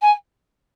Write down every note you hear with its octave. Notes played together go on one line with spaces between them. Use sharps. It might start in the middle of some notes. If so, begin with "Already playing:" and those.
G#5